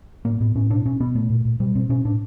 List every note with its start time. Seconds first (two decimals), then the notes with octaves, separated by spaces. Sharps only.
0.25 A2 A#3
0.40 A2 B3
0.55 A2 C#4
0.70 B2 D4
0.85 B2 C#4
1.00 B2 B3
1.15 A#2 A3
1.30 A#2
1.45 A#2
1.60 B2 G3
1.75 B2 C4
1.89 B2 C#4
2.05 A2 D4